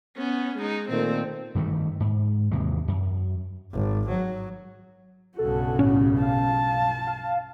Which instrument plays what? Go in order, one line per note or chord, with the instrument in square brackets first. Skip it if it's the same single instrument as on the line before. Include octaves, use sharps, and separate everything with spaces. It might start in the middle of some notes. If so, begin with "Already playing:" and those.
[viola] B3 C#4
G#3 D#4
[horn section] A#2 D#3 [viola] A3 C4
[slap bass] G2 D#3 E3 A3
G#2
D#2 C3 E3 G#3
F#2
[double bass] G#1
F#3
[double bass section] B1 G2 C#3 [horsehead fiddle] F#4 [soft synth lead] A4
[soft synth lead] A2 [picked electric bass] C#4
[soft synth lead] F5 [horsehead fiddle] A5
[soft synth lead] F5